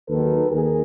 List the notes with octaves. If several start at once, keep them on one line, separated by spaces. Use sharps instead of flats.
D#2 D#3 F#3 A4 B4
D#2 D#3 G#4 A#4